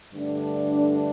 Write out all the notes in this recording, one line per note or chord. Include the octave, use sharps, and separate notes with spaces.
G2 D3 A3 D4